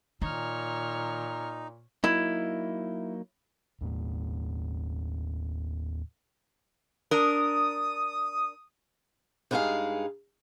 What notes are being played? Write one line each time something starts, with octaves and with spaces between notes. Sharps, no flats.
A#2 D#3 D#4 C#5 F6
F#3 A#3 D#4 E4
D#2 A2 A3
D4 A#4 D#6
G2 G#3 A#3 D#4 G#4 F5